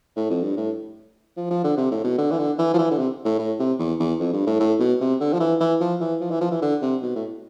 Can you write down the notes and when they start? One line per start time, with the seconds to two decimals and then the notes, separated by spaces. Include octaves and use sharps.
0.16 A2
0.30 F2
0.43 G2
0.57 A2
1.37 F3
1.50 F3
1.64 D3
1.77 C3
1.91 A2
2.04 B2
2.18 D3
2.31 E3
2.38 D3
2.58 E3
2.74 F3
2.79 E3
2.91 D3
2.98 C3
3.25 A2
3.39 A2
3.59 C3
3.79 E2
3.99 E2
4.20 F2
4.33 G2
4.46 A2
4.60 A2
4.80 B2
5.00 C3
5.20 D3
5.33 F3
5.40 E3
5.60 E3
5.80 F3
6.00 E3
6.20 F3
6.30 E3
6.41 F3
6.51 E3
6.62 D3
6.82 C3
7.02 B2
7.15 A2